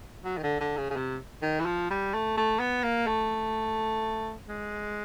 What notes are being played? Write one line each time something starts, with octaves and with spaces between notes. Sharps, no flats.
F#3
D#3
D3
D3
C#3
C#3
C3
D#3
E3
F3
G3
A3
A3
B3
A#3
A3
G#3